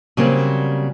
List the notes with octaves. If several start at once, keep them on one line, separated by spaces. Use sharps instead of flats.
C#3 F#3 G3 A#3 C4 C#4